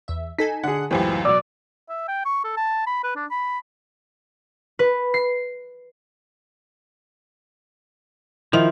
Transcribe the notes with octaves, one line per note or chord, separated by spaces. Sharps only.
E2 E5
D#4 A4 G#5 B6
D3 G#4 F#5
C#2 F#2 A2 E3 C4 G4
B2 F#3 D5 E6
E5
G5
C#6
A4
A5
B5
B4
D4
B5
B4
C7
D#3 F3 E4 F7